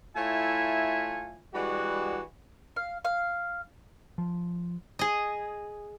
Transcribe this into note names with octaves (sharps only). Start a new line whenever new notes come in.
A3 E4 F4 C#5 E5 G#5
E3 G3 G#3 D4 F#4
F5
F5
F3
G#4 D#5